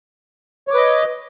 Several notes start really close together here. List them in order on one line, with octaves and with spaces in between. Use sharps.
C#5 D6 B4 D#5